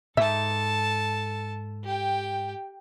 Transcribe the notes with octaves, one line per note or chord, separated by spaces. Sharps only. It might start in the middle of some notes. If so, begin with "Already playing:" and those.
G#2 A4 E5 A5
G4 G5